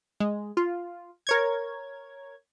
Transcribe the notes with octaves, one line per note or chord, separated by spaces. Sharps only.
G#3
F4
A#4 C#5 G#6